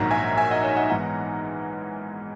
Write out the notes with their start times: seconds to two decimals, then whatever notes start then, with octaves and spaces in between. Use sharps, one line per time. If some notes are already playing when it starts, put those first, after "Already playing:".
Already playing: A#1 G#2 D#3 F#3 F#5 A#5
0.11 E5 G#5
0.38 E5 G#5
0.51 D#5 F#5
0.63 C#5 E5
0.76 D#5 F#5
0.90 G#2 E3 G#3 B3 D#4 F#5 A#5